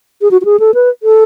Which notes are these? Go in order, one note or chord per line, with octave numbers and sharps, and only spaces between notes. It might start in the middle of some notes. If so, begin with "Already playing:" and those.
G#4
F#4
F#4
G#4
A4
B4
A4